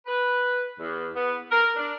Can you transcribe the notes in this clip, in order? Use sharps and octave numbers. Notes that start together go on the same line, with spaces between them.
B4
E2
B3
A#4
D4